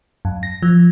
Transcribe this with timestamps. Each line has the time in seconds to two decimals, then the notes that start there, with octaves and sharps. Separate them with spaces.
0.25 F#2
0.43 A#6
0.62 F3